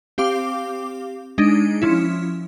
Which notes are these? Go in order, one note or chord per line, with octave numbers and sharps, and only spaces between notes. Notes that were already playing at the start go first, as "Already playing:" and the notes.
C4 G4 F5 D6
G#3 D4 D#4
F3 C#4 E4